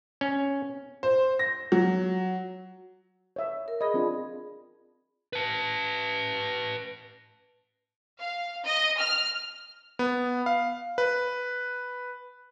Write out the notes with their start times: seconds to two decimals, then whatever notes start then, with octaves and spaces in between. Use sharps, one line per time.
0.21 C#4
1.03 C5
1.39 A#6
1.72 F#3
3.36 C#5 E5
3.68 A#4
3.81 G#4 D#5 B5
3.94 C4 D4 F4
5.33 B4 A5
8.19 F5
8.65 D#5
8.99 F6
9.99 B3
10.46 F5
10.98 B4